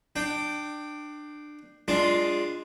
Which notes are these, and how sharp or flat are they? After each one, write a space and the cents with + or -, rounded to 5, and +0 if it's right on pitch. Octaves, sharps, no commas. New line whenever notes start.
D4 +20 G5 -10
G#3 -10 D4 +0 F4 +0